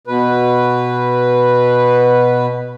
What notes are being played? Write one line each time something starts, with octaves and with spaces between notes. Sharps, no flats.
B2 B4